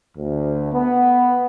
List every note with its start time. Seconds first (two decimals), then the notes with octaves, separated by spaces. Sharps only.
0.18 D2
0.72 B3